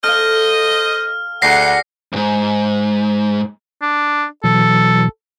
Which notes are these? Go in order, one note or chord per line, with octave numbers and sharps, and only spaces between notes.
A4 C5 D#5 F5 F6
D2 G#4 D5 F#5 A#6 C7
D#2 G#2
D4
B2 E3 F#3 A4